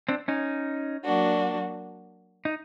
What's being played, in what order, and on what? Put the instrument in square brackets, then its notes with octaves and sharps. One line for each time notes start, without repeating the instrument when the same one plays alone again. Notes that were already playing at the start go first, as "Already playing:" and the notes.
[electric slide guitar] C4 D4
C#4 D#4
[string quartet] F#3 A#3 D4 F#4
[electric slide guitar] D#4